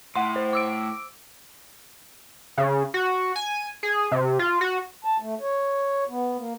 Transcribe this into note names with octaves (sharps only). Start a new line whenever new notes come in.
A2 F#5 C6
C5
D6 E6 D7
C#3
F#4
G#5
G#4
C3
F4
F#4
A5
A3
C#5
B3
A#3